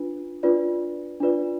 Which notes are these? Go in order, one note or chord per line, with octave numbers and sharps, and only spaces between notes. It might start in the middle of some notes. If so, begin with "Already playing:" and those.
Already playing: D4 F4 B4
D4 F4 B4 D5
D4 F4 B4 D5